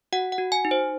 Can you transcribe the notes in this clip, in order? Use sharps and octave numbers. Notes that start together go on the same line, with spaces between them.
F#4 F#5
F#5
F#4
G#5
D#4
C5